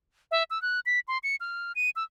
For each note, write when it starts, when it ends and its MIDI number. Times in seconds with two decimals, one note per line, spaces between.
0.31 0.43 76
0.50 0.61 88
0.62 0.80 90
0.86 1.00 95
1.08 1.18 84
1.23 1.36 97
1.40 1.72 89
1.76 1.90 99
1.96 2.04 88